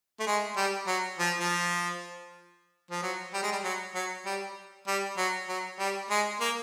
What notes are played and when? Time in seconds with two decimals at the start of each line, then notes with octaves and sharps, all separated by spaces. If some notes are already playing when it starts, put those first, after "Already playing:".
0.20 A3
0.26 G#3
0.57 G3
0.87 F#3
1.19 F3
1.40 F3
2.91 F3
3.02 F#3
3.34 G3
3.43 G#3
3.52 G3
3.64 F#3
3.95 F#3
4.26 G3
4.87 G3
5.17 F#3
5.48 F#3
5.79 G3
6.10 G#3
6.40 A#3